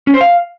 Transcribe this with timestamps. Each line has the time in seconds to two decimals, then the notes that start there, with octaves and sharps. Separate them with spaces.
0.07 C#4
0.14 C5
0.21 F5